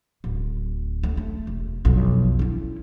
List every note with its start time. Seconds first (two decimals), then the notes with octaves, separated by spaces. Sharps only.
0.24 D1
1.03 A3
1.17 A3
1.47 E1
1.85 B1 F2
2.39 C#4 E4